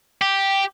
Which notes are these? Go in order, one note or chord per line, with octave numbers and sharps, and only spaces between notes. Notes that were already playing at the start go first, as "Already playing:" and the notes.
G4